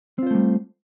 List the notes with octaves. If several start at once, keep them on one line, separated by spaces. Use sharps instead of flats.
G3 A3 C4 F4 C5